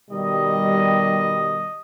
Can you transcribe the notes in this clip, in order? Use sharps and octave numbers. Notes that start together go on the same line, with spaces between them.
B2 D#3 G3 D#5